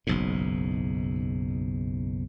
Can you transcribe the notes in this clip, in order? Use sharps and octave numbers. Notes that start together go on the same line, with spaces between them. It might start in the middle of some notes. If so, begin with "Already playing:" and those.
F#1 B1 G#2